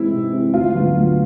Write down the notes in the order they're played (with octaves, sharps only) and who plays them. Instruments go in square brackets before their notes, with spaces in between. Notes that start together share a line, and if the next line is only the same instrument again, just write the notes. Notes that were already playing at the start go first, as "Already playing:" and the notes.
Already playing: [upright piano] C3 E3 G#3 C4 D#4 [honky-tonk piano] E4
[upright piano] C3
E3 G#3 C4 D#4
[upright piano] D2 [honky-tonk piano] F4
[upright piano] D3 F#3 B3
D2